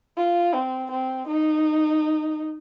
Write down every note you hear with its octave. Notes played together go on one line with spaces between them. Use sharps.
F4
C4
C4
D#4